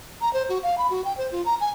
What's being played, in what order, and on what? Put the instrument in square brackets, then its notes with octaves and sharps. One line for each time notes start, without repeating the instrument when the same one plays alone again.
[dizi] A#5
C5
F#4
F5
B5
F#4
G5
C5
F4
A#5
G#5